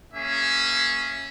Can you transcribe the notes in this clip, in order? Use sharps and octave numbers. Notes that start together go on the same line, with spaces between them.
A#3 C#4 G#4 E5